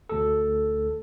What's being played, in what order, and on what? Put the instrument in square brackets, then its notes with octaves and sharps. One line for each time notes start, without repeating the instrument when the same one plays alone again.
[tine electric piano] D2 A4